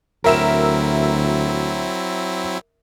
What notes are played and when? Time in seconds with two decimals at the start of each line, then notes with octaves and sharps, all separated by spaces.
0.24 D2 F#3 C4 E4 A#4 E5 E7